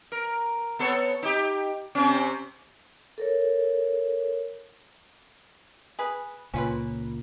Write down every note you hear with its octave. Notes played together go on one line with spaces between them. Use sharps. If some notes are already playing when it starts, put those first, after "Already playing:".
A#4
B3 A4 C#5
D#4 G4
C3 C4 C#4
A4 A#4 C#5
G#4 B4
C#2 A#2 C#4 F4 B4